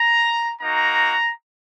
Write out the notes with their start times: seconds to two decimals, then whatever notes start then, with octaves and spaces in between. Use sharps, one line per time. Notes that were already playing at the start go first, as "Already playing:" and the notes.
Already playing: A#5
0.61 A#3 D#4 F#4 A#5